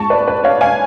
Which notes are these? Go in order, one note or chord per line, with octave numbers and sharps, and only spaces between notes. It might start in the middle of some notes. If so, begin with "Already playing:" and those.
Already playing: G#2 G#3 F4 A5 C#6
B4 D5
B4
C#5 F5
F5 G#5